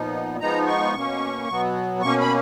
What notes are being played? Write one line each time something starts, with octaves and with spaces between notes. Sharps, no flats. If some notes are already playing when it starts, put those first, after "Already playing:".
Already playing: A#2 F3 B3 D#4
F3 G#3 B3 D#4 A#5
C#6
B2 A#3 C#4
B2 F#3 B3
B2 A#3 C#4 C#6
B5